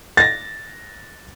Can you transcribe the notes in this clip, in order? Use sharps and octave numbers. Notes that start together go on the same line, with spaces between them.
A6 A#6